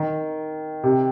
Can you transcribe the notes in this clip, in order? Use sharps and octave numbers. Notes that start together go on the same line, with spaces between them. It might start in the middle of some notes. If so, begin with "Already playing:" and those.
Already playing: D#3
C3